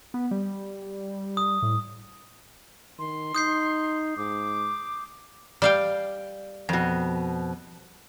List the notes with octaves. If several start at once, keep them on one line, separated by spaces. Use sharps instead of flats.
B3
G3
D#6
A2
D#3 C6
D#4 D#6 G6 C7
G#2 D6
G3 F5 G5
F2 B2